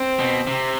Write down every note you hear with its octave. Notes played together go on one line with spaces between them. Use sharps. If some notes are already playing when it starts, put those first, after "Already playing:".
Already playing: C4
B2
C3